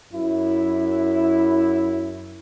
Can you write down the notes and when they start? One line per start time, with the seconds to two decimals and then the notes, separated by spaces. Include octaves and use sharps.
0.12 F#2 E4